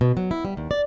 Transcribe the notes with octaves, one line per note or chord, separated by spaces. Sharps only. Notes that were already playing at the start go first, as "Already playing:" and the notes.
B2
F#3
E4
G3
D#2
D5